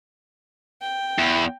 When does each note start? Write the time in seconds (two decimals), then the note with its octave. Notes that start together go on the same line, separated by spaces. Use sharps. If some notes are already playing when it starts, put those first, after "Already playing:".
0.81 G5
1.19 E2